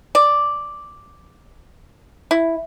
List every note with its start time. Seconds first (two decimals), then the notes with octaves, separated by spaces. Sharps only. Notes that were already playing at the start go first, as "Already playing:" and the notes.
0.15 D5
2.31 E4